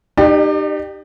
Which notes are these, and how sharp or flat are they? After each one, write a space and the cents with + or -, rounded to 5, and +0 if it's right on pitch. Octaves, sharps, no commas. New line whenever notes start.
D#4 -30 G4 +0 D5 +35